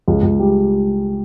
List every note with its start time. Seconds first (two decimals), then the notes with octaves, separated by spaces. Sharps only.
0.08 C#2
0.23 C#2
0.39 G3